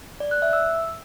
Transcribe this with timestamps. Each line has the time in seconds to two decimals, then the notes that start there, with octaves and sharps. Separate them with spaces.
0.20 D5
0.31 F#6
0.42 E5
0.53 E6